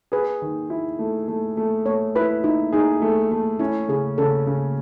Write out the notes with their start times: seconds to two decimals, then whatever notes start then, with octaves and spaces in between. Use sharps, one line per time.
0.12 G#4 B4
0.42 D#3
0.70 E4
0.99 A3
1.28 A3
1.57 A3
1.86 A3 C#5
2.15 E4 B4
2.44 D#4 E4
2.72 D#4 G#4
3.02 A3
3.32 A3
3.59 C#4 E4
3.88 C#3 G#4
4.18 C#3 A4
4.47 C#3